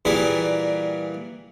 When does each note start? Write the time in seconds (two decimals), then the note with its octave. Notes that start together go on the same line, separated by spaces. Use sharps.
0.05 A#2 E3 G3 G#4 A#4 B4